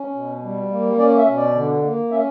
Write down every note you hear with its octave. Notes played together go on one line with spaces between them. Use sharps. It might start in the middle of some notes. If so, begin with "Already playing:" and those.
Already playing: C#4
B2
G3
A#3
C#4 D5
E5
B2
D5
D3
A#3
C#4 E5